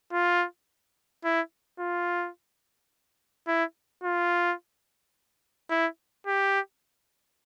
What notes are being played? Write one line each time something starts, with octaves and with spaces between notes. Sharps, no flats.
F4
E4
F4
E4
F4
E4
G4